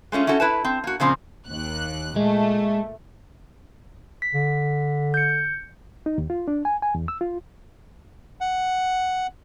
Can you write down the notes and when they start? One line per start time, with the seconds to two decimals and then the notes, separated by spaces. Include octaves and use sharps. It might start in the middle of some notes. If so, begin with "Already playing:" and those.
0.12 G#3 A3 C#4 F4
0.27 C#4 E4 F#4 A4
0.40 E4 B4 A5
0.64 C4
0.84 A#3 F#4
1.00 A#2 C#3 F3 C4
1.49 D#2 F#6
2.16 A#2 G#3 A3
4.22 B6
4.35 D3
5.14 G6 C#7
6.06 D#4
6.18 D#2
6.30 F4
6.48 D4
6.65 G#5
6.82 G#5
6.95 E2
7.08 E6
7.21 F4
8.41 F#5